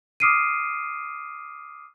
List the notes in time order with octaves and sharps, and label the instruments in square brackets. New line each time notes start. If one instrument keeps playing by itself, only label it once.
[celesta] D6 D#6 F6 C7 D7 D#7